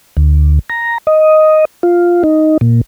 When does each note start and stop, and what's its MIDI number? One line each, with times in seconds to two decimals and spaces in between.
0.17 0.59 38
0.70 0.98 82
1.07 1.65 75
1.83 2.23 65
2.23 2.58 63
2.61 2.81 46